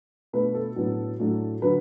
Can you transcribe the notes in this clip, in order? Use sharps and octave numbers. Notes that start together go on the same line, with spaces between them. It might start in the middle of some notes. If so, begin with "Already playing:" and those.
B2 A3 D4 B4
A4
A2 F#3 B3 D4
A2 F#3 A3 D4
D3 F#3 B4